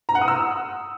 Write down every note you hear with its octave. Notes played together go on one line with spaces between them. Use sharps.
A#5
F#5
D#6
E6